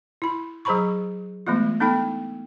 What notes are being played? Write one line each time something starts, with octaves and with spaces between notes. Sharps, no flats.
E4 B5
F#3 G#4 C5 A#5 B5 C#6
E3 G#3 A3 B3 F4
B3 D4 D#4 A4 G5 B5